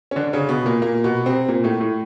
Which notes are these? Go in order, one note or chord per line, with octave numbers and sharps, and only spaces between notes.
C#4
D3 D4
C#3 C#4
B2 B3
A#2 A#3
A#2 A#3
B2 B3
C3 C4
A#2 A#3
A2 A3
A2 A3